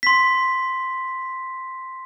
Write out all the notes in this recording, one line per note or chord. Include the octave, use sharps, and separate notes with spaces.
C6 B6